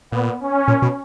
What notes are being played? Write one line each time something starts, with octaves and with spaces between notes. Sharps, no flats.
A#2 B3
C#4
A#2 C#4
B2